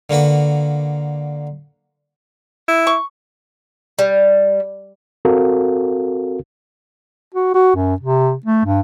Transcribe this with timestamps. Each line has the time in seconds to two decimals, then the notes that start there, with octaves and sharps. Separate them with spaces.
0.10 D3 A#3 F#4 B4 B5
2.68 E4
2.87 C#6
3.99 G3
5.25 C4 F#4 A4 A#4 F5
7.34 F#4
7.55 F#4
7.75 F#2
8.00 C3
8.46 A3
8.65 G2